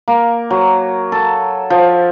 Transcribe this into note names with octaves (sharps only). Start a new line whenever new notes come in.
A#3
F#3
A4
F3